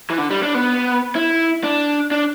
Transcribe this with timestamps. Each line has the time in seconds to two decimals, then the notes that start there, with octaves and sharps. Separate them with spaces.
0.10 E3
0.18 D3
0.30 G3
0.43 D4
0.55 B3
1.15 E4
1.64 D4
2.11 D4